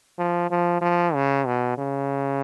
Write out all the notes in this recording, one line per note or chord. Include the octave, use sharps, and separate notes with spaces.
F3
F3
F3
C#3
B2
C#3